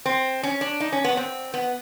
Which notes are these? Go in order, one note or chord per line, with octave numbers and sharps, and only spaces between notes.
C4
C#4
D4
D#4
C#4
B3
C4
B3